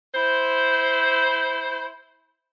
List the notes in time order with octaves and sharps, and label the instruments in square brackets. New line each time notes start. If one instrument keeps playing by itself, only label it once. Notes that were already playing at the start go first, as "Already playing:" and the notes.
[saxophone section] E4 C5